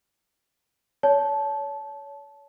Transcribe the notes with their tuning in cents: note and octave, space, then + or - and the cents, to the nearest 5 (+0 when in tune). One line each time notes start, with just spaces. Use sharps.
C#5 +30 A5 -15